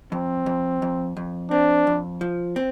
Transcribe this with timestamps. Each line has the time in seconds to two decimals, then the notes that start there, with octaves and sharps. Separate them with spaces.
0.12 F2 C4
0.46 F2
0.82 F2
1.17 F2
1.51 C4 D4
1.87 F2
2.21 F3
2.56 C4